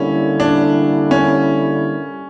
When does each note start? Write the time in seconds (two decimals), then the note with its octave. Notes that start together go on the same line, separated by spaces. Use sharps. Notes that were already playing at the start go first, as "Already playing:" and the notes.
Already playing: D3 G3 A#3 C#4 E4
0.40 D4
1.11 C#4